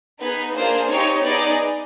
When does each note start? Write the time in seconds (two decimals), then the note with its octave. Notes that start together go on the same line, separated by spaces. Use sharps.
0.21 B3 D#4 G#4 B4
0.56 A#3 D4 F4 G#4 C5
0.90 C4 D#4 G4 C#5
1.25 B3 D#4 G#4 D5